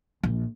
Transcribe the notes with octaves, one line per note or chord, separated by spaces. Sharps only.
A#1